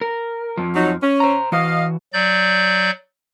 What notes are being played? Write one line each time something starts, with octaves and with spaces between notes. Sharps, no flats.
A#4
F2 F3
F#3 D#4
C#4
C5 A#5
E3 F#4 D#5 F5
F#3 D5 G6